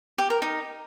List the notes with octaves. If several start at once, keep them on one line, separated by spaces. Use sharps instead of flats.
G4
A#4
D#4